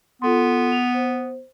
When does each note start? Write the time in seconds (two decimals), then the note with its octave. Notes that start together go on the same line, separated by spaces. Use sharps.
0.22 B3 F4 A4 C6
0.72 F7
0.94 C5